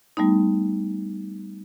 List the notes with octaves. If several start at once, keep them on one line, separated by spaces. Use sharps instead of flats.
G3 A3 B3 D#4